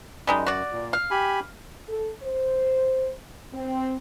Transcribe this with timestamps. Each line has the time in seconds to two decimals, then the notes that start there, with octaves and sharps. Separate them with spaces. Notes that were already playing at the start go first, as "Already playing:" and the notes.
0.27 F#2 G3 G#3 D#4
0.46 F#4 D5
0.72 A#2
0.93 F5
1.11 G4 G#5 B5
1.88 A4
2.23 C5
3.54 C4